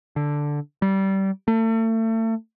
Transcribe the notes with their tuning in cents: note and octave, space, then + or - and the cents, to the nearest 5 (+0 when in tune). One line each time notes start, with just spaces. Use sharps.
D3 +0
G3 -20
A3 +35